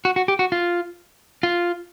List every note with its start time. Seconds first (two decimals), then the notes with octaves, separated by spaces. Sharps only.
0.05 F#4
0.16 F#4
0.28 G4
0.39 F#4
0.52 F4
1.43 F4